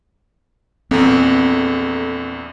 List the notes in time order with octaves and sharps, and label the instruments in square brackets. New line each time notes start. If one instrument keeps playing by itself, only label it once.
[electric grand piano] A#1 E2 [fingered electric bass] C4 [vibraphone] A4